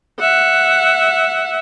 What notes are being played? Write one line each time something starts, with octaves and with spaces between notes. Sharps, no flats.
E5 F#5